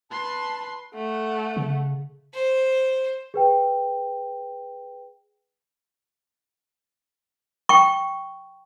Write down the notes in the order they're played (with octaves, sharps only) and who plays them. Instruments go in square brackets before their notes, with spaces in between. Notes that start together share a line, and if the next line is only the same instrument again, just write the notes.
[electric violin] B4 C6 [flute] A5
[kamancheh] A3 F#5
[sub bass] C#3
[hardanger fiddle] C5
[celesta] G#4 B4 G5
[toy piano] G5 C#6